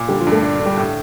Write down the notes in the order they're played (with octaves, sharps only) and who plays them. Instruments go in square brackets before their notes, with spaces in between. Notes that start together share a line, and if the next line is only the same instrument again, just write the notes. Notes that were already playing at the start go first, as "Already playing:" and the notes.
Already playing: [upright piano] A#2
[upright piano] D3 [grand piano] G3 G4
[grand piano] F3 F4
[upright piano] G2
[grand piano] A3 A4
[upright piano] D4
D3
[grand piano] G3 G4
[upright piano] A2